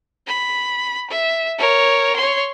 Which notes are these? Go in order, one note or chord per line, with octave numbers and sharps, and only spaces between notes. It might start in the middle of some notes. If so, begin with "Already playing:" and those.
B5
E5
A#4 C#5
C#5 C6